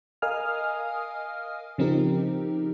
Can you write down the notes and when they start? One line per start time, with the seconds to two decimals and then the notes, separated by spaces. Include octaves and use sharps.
0.22 A#4 D#5 F5 G#5 D#6 F6
1.78 C#3 F3 C4 D#4 G4 A#4